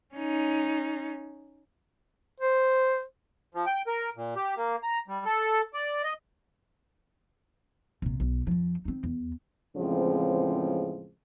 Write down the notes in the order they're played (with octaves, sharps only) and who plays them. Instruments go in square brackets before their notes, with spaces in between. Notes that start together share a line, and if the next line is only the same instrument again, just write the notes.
[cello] C#4 D#4
[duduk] C5
[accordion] F3
G5
A#4
A#2
G4
A#3
A#5
G3
A4
D5
D#5
[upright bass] A#1 C3
B1
F2 F3
C4 D#4
E2
[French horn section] E2 A2 C#3 F3 G#3 C4